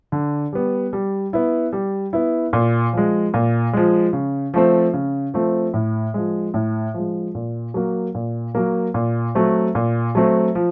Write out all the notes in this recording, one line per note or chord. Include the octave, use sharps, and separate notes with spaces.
D3
G3 B3
G3
B3 E4
G3
B3 E4
A#2
F3 G#3
A#2
F3 G#3
C#3
F3 A3 C4
C#3
F3 A3 C4
A2
F3 G#3
A2
F3 G#3
A#2
F#3 A#3
A#2
F#3 A#3
A#2
F#3 A3 C4
A#2
F#3 A3 C4
F3